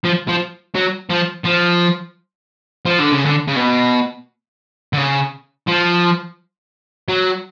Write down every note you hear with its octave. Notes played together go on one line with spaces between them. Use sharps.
F3
F3
F#3
F3
F3
F3
D3
C#3
D3
C#3
B2
D3
C#3
F3
F#3